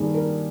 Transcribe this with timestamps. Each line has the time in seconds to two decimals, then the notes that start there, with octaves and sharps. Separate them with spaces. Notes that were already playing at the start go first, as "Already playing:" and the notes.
Already playing: G2 D#3 A#3 D#4 G#4
0.14 A#4